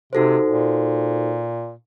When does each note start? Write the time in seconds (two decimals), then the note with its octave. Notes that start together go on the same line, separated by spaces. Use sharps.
0.13 C3 D#4 F#4 A4 C5
0.49 A#2